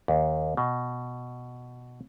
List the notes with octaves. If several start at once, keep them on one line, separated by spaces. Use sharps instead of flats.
D#2
B2